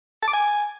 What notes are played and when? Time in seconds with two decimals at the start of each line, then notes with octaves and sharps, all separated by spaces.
0.23 A5
0.28 D6
0.33 G#5